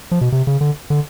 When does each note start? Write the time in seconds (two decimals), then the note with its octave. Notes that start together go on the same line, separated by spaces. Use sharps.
0.11 F3
0.21 B2
0.32 C3
0.47 C#3
0.61 D3
0.90 D3